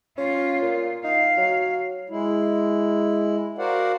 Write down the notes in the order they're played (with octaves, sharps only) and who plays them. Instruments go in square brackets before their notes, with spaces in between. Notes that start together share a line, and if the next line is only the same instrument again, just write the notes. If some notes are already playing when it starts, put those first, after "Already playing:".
[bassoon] C#4 [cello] F4
[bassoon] A#2
[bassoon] D#4 [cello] F5
[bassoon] F#3
[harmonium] G#3 E4
F#4 A#4 C5 D5 F5 F#5